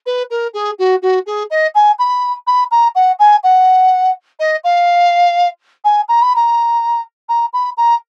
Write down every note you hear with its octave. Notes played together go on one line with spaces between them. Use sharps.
B4
A#4
G#4
F#4
F#4
G#4
D#5
G#5
B5
B5
A#5
F#5
G#5
F#5
D#5
F5
G#5
A#5
B5
A#5
A#5
B5
A#5